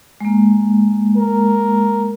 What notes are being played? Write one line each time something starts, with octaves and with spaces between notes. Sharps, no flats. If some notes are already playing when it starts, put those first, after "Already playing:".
G#3 A#3
A#4